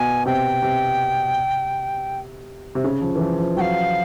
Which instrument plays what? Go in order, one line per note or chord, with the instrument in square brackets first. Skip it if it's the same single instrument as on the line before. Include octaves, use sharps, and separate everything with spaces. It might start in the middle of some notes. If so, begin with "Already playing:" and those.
Already playing: [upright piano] B2 [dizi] G#5
[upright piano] C3 [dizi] G5
[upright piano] C3
C3
C#3
F3
E3
F3
F3
[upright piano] F#3 [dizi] G5
[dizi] F5